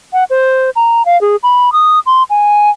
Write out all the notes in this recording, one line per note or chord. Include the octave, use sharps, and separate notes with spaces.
F#5
C5
A#5
F5
G#4
B5
D#6
C6
G#5